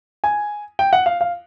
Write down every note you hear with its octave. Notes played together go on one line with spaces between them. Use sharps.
G#5
G5
F#5
F5
F5